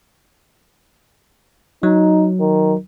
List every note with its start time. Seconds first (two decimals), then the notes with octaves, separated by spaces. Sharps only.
1.83 F#3 D#4
2.40 D#3